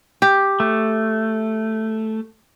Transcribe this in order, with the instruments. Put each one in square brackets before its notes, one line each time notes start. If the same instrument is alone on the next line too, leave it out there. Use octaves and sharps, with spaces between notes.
[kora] G4
[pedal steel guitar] A3